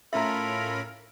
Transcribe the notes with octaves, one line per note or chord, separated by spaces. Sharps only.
A2 C#4 F4 A4 A#4 E5 A#5 B5